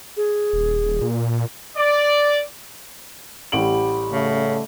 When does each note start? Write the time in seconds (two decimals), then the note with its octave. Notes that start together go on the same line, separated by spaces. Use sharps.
0.17 G#4
0.53 D#1
1.01 A#2
1.77 D5
3.52 A1 G3 D7 F#7
4.12 C#3 A3